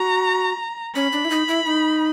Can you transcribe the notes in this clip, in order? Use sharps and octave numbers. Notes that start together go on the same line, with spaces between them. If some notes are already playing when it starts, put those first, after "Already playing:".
Already playing: F#4 A#5
C#4 B5
D4
E4
D#4
E4
D#4